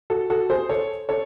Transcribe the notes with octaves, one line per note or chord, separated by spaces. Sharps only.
F#4 A4
F#4 A4
G#4 C5
A4 C#5
A4 C#5